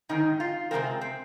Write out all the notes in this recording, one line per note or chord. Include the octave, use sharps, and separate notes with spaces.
G#2 D#3 C4 D#4
F4
C3 D#3 G#3 C4 A#4
C4